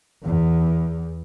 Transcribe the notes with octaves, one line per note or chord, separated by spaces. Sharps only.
E2